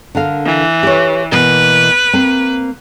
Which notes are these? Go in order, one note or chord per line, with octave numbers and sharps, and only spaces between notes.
D3 A#4 F5
E3
G4 B4 C#5
B2 E3 A#3 B4
A#3 C4